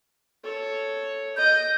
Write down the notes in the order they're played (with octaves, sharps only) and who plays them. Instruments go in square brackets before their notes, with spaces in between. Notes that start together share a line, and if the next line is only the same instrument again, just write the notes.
[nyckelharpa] A4 C#5
[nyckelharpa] D#5 [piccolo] G6